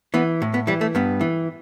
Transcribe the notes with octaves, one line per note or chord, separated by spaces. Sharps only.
E3 B3
A2
B3
E3 G3
A3
G2 B3
E3